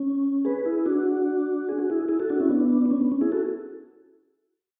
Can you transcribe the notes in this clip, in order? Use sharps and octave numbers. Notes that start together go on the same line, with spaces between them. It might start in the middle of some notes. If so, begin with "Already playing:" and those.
Already playing: C#4
G#4 B4
E4 G#4
D4 F#4
G#4
F#4
E4 G#4
E4 G#4
F#4 A4
D4 F#4
C#4 E4
B3 D4
D4
C#4
B3
C#4
E4 G#4
F#4 A4